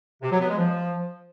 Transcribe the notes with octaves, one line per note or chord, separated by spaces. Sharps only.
C3
F#3
B3
G#3
F3